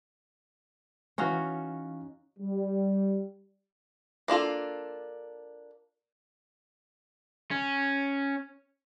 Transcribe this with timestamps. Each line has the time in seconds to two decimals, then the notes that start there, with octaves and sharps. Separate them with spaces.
1.18 E3 C#4 D#4 F#4 F5 C#6
2.38 G3
4.28 A#3 D4 F4 A4
7.51 C#4